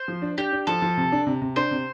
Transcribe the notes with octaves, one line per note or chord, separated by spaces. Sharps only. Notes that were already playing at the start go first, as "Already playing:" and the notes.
Already playing: C5
F3
D4
D4 G4
D4
F3 A4
F3
C3
D4
C3
C3
D4 C5
C3